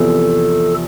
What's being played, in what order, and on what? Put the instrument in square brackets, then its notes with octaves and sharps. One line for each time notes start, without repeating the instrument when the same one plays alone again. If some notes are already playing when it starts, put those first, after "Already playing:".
Already playing: [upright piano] E2 C3 F3 [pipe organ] A4